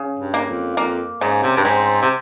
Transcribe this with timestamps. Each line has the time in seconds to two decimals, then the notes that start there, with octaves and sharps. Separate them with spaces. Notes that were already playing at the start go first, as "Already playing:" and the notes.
Already playing: C#3
0.19 G2
0.34 A#3
0.49 F2
0.77 F2 A#3
1.21 G#2 C#3
1.43 C3
1.57 G2
1.65 G#2 C4
2.02 C3